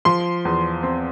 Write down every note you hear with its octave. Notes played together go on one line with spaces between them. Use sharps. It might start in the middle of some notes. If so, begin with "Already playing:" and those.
F3 C6
E2
C4